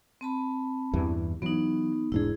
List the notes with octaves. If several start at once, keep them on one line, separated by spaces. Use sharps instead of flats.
C4 A5 B5
E2 G2 E3
E3 F#3 B3 D#4
E1 G#2 D4 E4 G#4